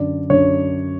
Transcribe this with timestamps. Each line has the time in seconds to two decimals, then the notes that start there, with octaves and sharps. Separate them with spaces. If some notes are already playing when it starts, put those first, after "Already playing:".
Already playing: F#2 D3 D5
0.30 F#2 D3 C#5